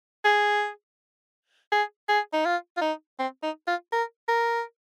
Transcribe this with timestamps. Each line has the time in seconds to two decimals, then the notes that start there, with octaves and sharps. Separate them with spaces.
0.25 G#4
1.72 G#4
2.09 G#4
2.33 D#4
2.46 F4
2.77 F4
2.81 D#4
3.19 C4
3.43 D#4
3.67 F4
3.92 A#4
4.29 A#4